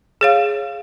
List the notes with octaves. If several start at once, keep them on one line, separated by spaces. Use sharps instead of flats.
G#4 C#5 F5